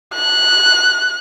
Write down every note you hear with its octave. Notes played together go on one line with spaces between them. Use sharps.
F#6